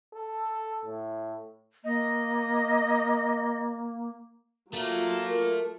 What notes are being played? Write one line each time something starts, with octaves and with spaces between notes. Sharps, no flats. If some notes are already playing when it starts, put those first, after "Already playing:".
A4
A2
A#3 D#5
F#3 A3 A#3 F4
A#4